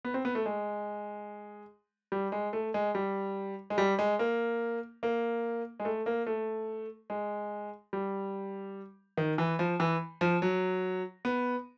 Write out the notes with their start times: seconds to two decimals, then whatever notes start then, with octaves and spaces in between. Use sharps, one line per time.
0.05 B3
0.14 C4
0.25 B3
0.35 A3
0.46 G#3
2.12 G3
2.32 G#3
2.53 A3
2.74 G#3
2.95 G3
3.70 G#3
3.78 G3
3.99 G#3
4.19 A#3
5.03 A#3
5.80 G#3
5.85 A3
6.06 A#3
6.27 A3
7.10 G#3
7.93 G3
9.17 D#3
9.38 E3
9.59 F3
9.80 E3
10.21 F3
10.42 F#3
11.25 B3